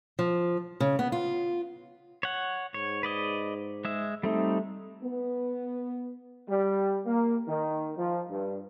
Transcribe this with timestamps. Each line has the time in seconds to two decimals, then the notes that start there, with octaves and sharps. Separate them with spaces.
0.19 F3
0.80 C#3
0.99 B3
1.12 F4
2.23 C#5 F#5
2.74 G#2 C#5
3.03 B4 D5 D#5
3.85 G#3 E5
4.23 G3 A3 C4 D#4
5.03 B3
6.49 G3
7.06 A#3
7.48 D#3
7.98 F3
8.30 G2